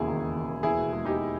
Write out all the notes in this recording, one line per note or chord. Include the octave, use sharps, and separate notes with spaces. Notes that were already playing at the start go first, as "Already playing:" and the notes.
Already playing: E1 D#2 C#3 E4 G#4
D#3
E1
E1
D#2
E2 E4 G#4
B2
G#3
E2 D#4 G4